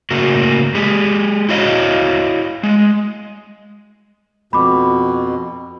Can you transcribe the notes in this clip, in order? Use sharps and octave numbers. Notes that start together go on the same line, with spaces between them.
A2 C#3 A#3 F#4
G#3 G4 G#4
E4 F#4 C#5 D#5 F5
G#3
F2 B2 B5 D6